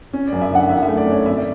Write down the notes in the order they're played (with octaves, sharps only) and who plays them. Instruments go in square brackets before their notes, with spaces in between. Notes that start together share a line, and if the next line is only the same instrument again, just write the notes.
[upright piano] C#4
D5
F#2
E5
D3 F#5
F#2 E5
F#5
E5
A3
D5
C#4 C#5
G#1 E5
D5